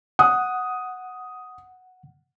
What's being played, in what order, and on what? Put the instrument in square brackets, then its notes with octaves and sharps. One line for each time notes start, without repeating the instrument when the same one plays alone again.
[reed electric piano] F#5 [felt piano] D#6